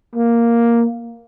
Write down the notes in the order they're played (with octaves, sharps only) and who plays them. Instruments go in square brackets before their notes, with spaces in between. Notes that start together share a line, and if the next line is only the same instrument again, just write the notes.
[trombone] A#3